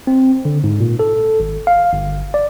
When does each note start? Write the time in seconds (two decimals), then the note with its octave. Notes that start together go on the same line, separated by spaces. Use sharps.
0.07 C4
0.45 D3
0.64 G#2
0.80 A#2
0.99 A4
1.40 G#1
1.67 F5
1.93 G1
2.34 D5